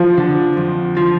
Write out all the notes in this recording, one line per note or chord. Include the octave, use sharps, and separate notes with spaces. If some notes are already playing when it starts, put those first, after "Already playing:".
Already playing: F3
D3
F2
F3